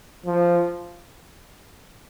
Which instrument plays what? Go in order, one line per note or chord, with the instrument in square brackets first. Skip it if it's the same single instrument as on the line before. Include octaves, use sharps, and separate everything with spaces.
[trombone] F3